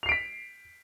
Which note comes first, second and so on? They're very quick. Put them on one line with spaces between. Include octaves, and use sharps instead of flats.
F7 C7 D7 B6